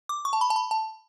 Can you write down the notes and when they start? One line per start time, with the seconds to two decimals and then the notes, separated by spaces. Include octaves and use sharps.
0.09 D6
0.25 C#6
0.33 A5
0.41 B5
0.50 A5
0.56 B5
0.71 A5